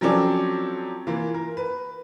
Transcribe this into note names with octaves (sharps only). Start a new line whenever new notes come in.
F3 F#3 C4 C#4 A4 D5
E3 A#3 F4
A#4
B4